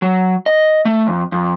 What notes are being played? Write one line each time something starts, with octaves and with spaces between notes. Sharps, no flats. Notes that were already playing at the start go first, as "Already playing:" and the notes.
F#3
D#5
A3
F2
F2